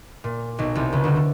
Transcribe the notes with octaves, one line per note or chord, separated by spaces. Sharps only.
A#2
B1 B2
C2 C3
C#2 C#3
D2 D3
D3